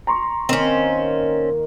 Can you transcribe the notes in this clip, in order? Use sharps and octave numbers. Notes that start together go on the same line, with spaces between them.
A#5 C6 C#6
D#3 A#3 C4 C#4